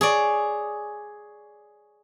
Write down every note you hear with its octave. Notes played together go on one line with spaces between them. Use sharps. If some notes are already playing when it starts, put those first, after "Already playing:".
G#4 C#5 D5